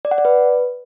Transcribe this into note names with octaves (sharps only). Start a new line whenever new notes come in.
D5
F#5
D5
B4